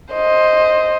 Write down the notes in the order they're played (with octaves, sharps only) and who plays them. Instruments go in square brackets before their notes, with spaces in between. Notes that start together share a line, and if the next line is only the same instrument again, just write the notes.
[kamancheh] C5 D#5